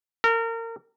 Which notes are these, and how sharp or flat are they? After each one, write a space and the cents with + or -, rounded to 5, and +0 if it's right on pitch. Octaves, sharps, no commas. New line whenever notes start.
A#4 -30